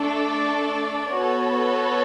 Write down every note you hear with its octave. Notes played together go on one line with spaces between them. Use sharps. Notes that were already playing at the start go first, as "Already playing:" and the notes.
Already playing: A3 D4 A4
D5
B3 F#4 A4 C#5